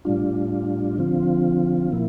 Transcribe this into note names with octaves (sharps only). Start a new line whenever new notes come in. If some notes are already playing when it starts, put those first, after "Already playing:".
A2 G3 D4 F4
D3 F3 C4 F4
A#2 F3 A#3 E4